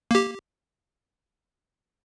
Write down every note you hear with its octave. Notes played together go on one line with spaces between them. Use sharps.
A#3 G4